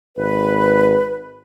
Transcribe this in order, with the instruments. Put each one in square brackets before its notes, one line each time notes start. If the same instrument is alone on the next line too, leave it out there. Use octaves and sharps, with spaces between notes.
[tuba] G#1 [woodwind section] B4